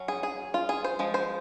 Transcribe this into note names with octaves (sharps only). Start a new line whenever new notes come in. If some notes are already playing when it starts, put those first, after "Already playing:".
Already playing: F#3 C#4
G#4
G#4
F4
G#4
C5
F3 G#3
C5